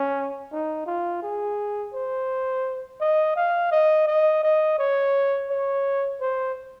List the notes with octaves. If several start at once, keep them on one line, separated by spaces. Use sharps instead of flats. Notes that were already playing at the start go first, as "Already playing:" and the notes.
Already playing: C#4
D#4
F4
G#4
C5
D#5
F5
D#5
D#5
D#5
C#5
C#5
C5